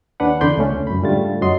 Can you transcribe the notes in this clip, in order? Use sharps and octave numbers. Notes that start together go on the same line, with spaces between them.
D#2 C#4 D4 B4 F#5
E2 D3 D5 B5 C6 G6
C#2 A3 C#4
F#2 B5
G#2 D3 G3 A3 F4 A6
F#2 F#3 D#5 C6